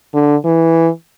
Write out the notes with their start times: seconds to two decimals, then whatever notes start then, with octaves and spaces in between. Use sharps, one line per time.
0.14 D3
0.45 E3